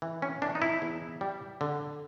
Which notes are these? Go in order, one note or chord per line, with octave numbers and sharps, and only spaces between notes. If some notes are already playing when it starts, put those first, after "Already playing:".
E3
C#4
E3 D4
D#4
E4
E2
G3
D3